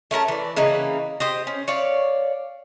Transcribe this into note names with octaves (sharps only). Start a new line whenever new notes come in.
A3 C#4 A#4 A5
E3 D5
C#3 E3 A#3 D#4
G4 C5 D#5
C#4
C#5 D5 F5